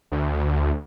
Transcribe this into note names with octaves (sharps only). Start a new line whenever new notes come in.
D2